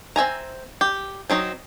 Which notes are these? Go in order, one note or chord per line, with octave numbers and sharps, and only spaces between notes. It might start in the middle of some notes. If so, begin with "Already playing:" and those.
C4 E5 G#5 A#5
G4
F#3 C4 D#4